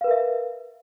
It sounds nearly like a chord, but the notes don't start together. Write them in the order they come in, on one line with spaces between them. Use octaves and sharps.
F5 B4 A#4 E5